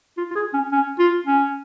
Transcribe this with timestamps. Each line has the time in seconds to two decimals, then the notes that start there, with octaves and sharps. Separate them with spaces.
0.18 F4
0.31 F4
0.36 G#4
0.54 C#4
0.72 C#4
0.99 F4
1.26 C#4